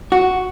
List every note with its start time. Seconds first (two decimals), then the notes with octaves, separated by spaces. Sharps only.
0.12 F#4